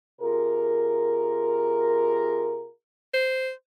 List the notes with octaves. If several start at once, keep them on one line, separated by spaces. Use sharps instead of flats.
C3 F4 G#4 A#4
C5